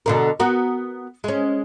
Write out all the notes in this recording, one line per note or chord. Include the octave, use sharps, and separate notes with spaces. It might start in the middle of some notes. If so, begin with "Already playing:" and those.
B2 D3 A#4
B3 F#4 A#4
G#3 C#4